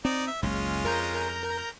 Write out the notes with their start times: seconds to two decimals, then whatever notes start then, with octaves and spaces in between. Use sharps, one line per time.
0.05 C4 D#4 D5
0.28 E5
0.43 F#1 C#2 G#3 C#4 F4
0.85 F2 A#4 A#5 G6